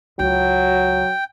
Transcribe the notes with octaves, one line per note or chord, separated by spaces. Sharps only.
C#2 F#3 G5